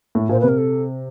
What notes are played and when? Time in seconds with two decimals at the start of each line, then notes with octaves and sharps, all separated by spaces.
0.15 A2
0.29 A#2 C5
0.40 C3 B4
0.49 A#4
0.58 A4